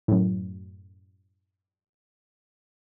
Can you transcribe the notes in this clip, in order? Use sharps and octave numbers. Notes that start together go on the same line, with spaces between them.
F#2 A2